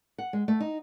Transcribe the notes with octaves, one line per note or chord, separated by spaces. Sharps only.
F#5
G#3
A3
D#4